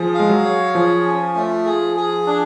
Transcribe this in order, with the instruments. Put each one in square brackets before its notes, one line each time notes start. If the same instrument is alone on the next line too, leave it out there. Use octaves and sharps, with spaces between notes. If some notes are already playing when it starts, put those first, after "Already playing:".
Already playing: [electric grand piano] F3 [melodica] G#4
[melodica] F5
[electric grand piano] G#3
F#3
[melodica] C#5
[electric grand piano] F3 [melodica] G#4
[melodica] C#4
A3
G#4
G#4
D4